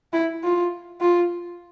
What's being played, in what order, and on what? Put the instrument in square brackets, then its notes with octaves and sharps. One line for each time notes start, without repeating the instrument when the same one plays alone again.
[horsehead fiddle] E4
F4
F4